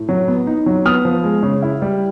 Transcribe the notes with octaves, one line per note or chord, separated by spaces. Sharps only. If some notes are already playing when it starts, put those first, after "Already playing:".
Already playing: A2
F#3
B3
D#4
F#3
B3 D#6 F6
F3
G#3
C#3
E4
G3